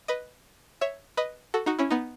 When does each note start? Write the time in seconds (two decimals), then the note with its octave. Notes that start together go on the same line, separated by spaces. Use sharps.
0.08 B4 D#5
0.81 C#5 E5
1.17 B4 D#5
1.54 F#4 A4
1.66 D#4 F#4
1.79 C#4 E4
1.91 B3 D#4